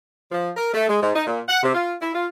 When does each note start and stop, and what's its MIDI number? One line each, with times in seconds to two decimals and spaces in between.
0.32 0.50 53
0.56 0.69 70
0.74 0.86 57
0.89 0.98 56
1.02 1.11 44
1.15 1.24 63
1.27 1.41 46
1.48 1.62 78
1.63 1.71 48
1.74 1.93 65
2.02 2.12 64
2.15 2.27 65